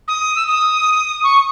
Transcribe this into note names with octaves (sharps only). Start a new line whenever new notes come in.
D#6
E6
D#6
C#6